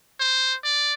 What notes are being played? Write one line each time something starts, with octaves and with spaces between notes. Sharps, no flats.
C5
D5